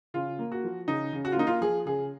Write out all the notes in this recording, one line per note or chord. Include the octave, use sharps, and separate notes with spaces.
C#3 F4
A#3
F#4
F3
C#3 D#4
C#3
F#4
F4
A#3 D#4
F4
F3 G#4
C#3 G#4